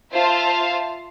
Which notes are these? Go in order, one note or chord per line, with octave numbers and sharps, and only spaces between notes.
F4 C5 E5 F5 A5